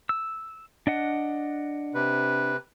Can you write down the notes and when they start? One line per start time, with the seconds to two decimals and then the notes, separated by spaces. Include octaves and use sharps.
0.09 E6
0.87 D4 D#5 F#5
1.94 C3 B4